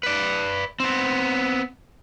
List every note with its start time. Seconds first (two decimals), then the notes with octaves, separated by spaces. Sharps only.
0.03 B4 D5
0.80 B3 C4